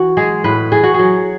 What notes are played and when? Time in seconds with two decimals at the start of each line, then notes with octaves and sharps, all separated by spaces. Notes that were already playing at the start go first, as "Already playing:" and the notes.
Already playing: E3 F#4
0.17 G#3 G#4
0.44 A2 B4
0.72 E3 G#4
0.83 F#4
0.94 G#4
0.99 F#3